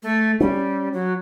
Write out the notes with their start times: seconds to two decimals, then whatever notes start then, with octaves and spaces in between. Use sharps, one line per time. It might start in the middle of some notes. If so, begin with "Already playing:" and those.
0.03 A3
0.40 G3 C#4
0.93 F#3